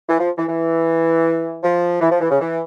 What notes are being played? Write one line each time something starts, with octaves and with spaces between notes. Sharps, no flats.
E3
F3
E3
E3
F3
E3
F3
E3
C#3
E3